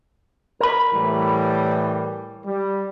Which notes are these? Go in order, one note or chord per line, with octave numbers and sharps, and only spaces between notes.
A#4 B5
A2 E3 G3
G3